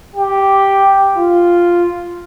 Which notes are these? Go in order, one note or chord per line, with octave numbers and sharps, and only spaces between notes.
G4
F4